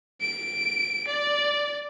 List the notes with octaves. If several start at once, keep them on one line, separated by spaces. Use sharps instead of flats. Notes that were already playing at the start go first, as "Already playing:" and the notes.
D7
D5